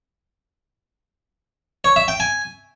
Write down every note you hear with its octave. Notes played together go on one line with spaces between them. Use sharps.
C#5
E5
G5
G#5